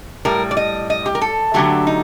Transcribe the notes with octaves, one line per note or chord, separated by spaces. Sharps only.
A2 G3 A#4
D5
D#5
D#5
G4
A#4
A4
D3 F#3 A3 G4
D#4